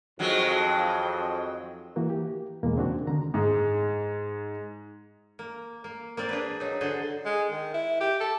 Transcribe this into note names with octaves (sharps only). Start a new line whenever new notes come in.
F2 D#3 F#3 G#3
E3 A#3 F#4
G4
E2 B2 G#3 A#3
C#3 C4 D4 F#4
D3 D#3 A#5
G#2 G#3
A#3
A#3
A#3 C4 D5
D4 G#4 B4
F#3 D#4
D3 F#4 G#4 C5
G#3
D#3
E4
G4
A4